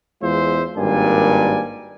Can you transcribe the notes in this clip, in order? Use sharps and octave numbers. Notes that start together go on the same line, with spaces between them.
E2 G#3 F4 C5 E5
G#1 G2 A#3 D5 G#5